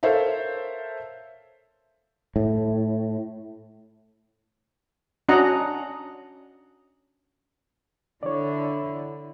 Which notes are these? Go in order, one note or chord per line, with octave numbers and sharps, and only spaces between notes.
A4 A#4 C5 C#5 E5 F5
A2
C#4 D4 F#4 D#5 F#5 A#5
D3 E4 C#5 D5